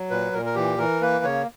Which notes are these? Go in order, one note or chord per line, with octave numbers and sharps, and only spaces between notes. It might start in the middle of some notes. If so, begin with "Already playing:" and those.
Already playing: F#3
A#2 B4
A#2 A#4
A#4
E3 G4
E3 A#4
A#3 B4
C#3 C#5